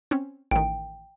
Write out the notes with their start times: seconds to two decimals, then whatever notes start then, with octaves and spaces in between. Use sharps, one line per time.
0.11 C4 C#4
0.51 A1 D#3 G5